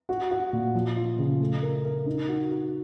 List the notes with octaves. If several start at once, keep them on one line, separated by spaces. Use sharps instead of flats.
F#4
F#4
A#2
F3
F4
C#3
A3
A#4
A#4
D#4
F#4
F#4